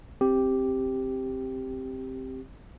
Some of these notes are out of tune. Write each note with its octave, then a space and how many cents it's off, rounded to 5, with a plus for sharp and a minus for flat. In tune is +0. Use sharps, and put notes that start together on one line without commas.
C4 +5 G4 +0